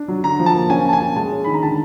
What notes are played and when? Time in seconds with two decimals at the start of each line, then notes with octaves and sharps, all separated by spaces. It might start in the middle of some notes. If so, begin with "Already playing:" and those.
Already playing: D4
0.08 F#3
0.23 D3 A#5
0.39 F3
0.46 A5
0.54 A#3
0.70 C#4 G#5
0.85 C#4 A5
0.93 G#5
1.01 C#4
1.16 G#3 A5
1.32 C#4
1.44 D#3 B5
1.54 A#5
1.63 D3 A5